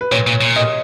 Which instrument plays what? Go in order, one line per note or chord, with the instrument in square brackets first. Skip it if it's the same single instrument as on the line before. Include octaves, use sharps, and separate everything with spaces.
[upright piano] B4
[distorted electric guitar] A#2 [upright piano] C#5
[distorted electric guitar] A#2
A#2
[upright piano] D#5